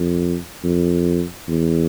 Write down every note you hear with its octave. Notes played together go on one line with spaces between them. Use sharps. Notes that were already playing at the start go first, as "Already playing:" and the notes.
Already playing: F2
F2
E2